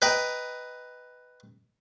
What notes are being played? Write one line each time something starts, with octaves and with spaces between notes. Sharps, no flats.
B4 D#5 G5 A#5